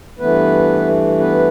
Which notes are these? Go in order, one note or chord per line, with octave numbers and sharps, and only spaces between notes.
G2 E3 A3 B3 B4
B3 B4